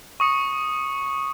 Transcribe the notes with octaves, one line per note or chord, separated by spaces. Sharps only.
C#6 D#6 C#7